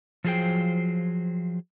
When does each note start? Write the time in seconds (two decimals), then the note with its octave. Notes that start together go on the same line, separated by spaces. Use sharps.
0.24 F3 F#3 F4 G#4 C5 G5